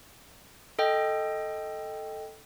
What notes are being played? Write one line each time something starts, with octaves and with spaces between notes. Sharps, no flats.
A4 D#5 G5